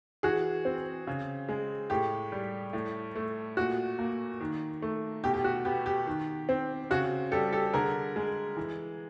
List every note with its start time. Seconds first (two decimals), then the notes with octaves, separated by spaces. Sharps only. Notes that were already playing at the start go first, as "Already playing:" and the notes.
0.23 E3 F#4 G#4
0.65 C4
1.07 C#3
1.49 G#3
1.90 A2 G4
2.32 G3
2.73 A2
3.15 A3
3.57 A#2 F#4
3.99 A#3
4.41 D#3
4.82 A3
5.24 B2 G4
5.34 G4
5.44 F#4
5.65 B3 G4
5.86 G4
6.07 D#3
6.49 C4
6.90 C#3 F#4
7.31 G3 G4 A4
7.53 G4 A4
7.73 D3 G#4 A#4
8.16 G#3
8.57 E3